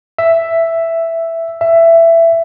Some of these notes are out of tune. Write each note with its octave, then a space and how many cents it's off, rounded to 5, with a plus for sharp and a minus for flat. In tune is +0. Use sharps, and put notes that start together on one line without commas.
E5 +5
E5 +15